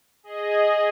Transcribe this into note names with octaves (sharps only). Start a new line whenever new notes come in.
G#4 D#5